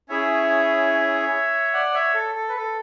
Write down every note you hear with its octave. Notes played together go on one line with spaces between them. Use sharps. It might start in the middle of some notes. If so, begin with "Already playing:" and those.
C#4 E4 G#4 C#5 E5
D5 F#5
C#5 E5
A4
A4
B4
A4